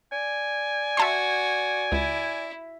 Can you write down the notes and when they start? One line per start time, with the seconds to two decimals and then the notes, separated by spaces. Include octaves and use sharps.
0.12 D5 G#5
0.97 F#4 E5 A5 C6
1.92 C#2 E4